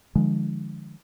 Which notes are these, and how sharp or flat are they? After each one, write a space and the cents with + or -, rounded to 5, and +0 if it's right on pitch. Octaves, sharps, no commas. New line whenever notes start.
D3 +45 F3 +0 G#3 +0